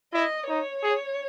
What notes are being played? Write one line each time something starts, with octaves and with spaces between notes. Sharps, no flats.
E4 D#5
D#4 C#5
G#4